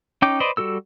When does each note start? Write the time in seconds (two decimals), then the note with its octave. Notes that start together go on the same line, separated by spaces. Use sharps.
0.22 C#4 D#4 G5 D6 G6
0.40 B4 C5 D5 D#5
0.57 G3 F#4 A4 E6